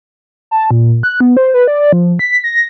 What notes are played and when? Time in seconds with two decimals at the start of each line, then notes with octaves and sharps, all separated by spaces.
0.51 A5
0.71 A#2
1.03 F#6
1.20 B3
1.37 C5
1.54 B4
1.67 D5
1.92 F3
2.19 B6
2.44 A#6